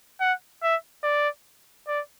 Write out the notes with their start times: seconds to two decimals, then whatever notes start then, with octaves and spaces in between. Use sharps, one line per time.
0.21 F#5
0.63 E5
1.04 D5
1.88 D5